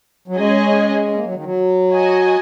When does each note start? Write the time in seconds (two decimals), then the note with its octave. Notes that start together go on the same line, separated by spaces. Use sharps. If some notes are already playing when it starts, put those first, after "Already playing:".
0.28 F#3
0.37 G#3 C#4 G#4 D#5 G#5
1.08 C#4
1.15 A#3
1.24 F#3
1.34 D#3
1.44 F#3
1.92 F#4 D#5 G#5